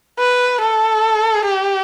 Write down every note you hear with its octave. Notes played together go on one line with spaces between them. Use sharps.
B4
A4
G4